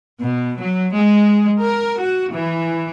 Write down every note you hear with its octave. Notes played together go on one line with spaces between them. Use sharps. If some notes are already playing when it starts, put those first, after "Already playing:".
B2
F#3
G#3
A#4
F#4
E3